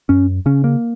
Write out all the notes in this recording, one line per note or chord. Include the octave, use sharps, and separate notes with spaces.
F#2 C#4
C#3 C#4
A#3